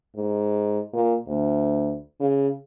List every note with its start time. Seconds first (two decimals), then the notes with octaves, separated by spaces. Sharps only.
0.16 G#2
0.93 A#2
1.27 D2
2.20 C#3